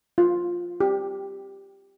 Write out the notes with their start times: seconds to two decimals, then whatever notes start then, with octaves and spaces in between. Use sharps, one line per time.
0.18 F4
0.80 G4